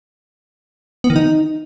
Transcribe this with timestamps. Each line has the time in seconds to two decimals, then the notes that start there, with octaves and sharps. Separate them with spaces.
1.04 B3
1.10 D#3
1.16 D#4